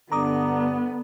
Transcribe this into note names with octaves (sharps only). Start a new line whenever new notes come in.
G2 D3 B3 A#5 D6 D#6